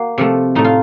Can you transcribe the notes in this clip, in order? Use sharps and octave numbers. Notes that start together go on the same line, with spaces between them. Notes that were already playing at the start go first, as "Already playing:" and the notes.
Already playing: A#3 F#4
C3 F3 A3
A2 A3 D#4
F4